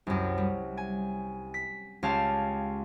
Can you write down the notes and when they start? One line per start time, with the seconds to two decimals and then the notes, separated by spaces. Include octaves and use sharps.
0.07 C2 F#2
0.38 G3
0.77 G#5
1.54 B6
2.03 C#2 C#4 G4 F5 A5